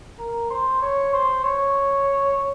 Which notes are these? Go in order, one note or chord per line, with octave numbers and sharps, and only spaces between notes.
A#4
C5
C#5
C5
C#5